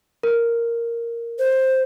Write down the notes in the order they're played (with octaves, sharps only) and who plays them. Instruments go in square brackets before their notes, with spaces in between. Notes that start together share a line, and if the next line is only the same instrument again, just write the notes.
[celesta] A#4
[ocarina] C5